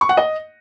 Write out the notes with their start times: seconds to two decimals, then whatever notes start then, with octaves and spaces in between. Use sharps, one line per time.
0.01 C#6
0.09 F#5
0.17 D#5